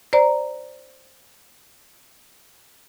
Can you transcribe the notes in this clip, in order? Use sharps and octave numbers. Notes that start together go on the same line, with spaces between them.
C5 D5 A#5